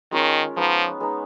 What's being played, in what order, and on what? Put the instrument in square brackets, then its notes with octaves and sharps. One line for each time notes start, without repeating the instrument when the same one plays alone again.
[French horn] D#3 [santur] G#3 C#4 F4 A#4
[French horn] F3 [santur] G#3 B3 D#4
[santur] G#3 B3 D#4